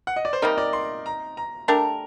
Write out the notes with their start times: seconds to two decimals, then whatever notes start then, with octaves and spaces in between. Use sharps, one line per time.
0.07 F#5
0.16 D#5
0.25 D5
0.33 C5
0.42 C3 G3 A#3 D#4 A#4
0.58 D5
0.73 C6
1.06 A#5
1.37 A#5
1.68 A3 D4 G4 A#4